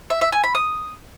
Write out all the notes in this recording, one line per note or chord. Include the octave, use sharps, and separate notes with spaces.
E5
E5
G#5
B5
D#6